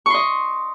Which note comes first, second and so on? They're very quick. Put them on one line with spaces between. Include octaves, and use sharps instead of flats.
C#6 C6 D#5